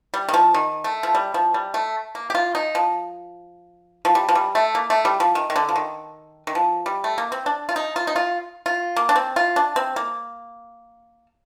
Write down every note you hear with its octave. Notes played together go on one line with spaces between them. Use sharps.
G3
D#3
F3
D#3
A3
F3
G3
F3
G3
A3
A#3
G4
F4
D#4
F3
F3
G3
F3
G3
A3
A#3
A3
G3
F3
D#3
D#3
D3
F3
D#3
D#3
F3
G3
A3
A#3
C4
D4
F4
D#4
F4
D#4
F4
F4
A#3
D4
C4
F4
D4
C4
A#3